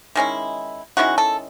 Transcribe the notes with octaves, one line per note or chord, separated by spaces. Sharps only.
D#3 G#3 C#4 E4
D#3 G#3 C#4 E4 F#4
A4